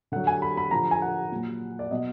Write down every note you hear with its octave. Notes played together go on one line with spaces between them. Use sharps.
D3 F#3 F#5
G#5
B5
B5
D3 F3 A#5
G#5
F#5
A#2 F#3
D5
B2 F#3 D#5